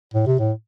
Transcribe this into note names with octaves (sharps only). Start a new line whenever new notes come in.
A2
C3
A2